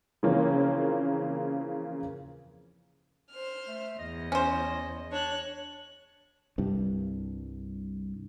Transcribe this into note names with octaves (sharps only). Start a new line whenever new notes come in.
C#3 E3 F3 A#3 C4 C#4
C5 F6
A3
E2 D#5
C#4 C5
D4 C#5 F#6
C2 G2